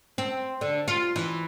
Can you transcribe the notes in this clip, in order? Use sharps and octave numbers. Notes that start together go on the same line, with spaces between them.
C4
D3
F4
E3